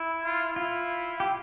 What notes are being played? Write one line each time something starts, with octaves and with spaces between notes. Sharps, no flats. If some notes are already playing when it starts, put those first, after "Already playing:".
Already playing: E4
F4
E4 F4
G4